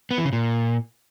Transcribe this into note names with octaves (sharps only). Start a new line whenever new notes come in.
B3
E3
C#3
A#2